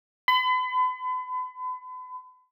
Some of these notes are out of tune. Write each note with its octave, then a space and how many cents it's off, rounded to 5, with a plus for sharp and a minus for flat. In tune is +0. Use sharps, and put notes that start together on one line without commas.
B5 +40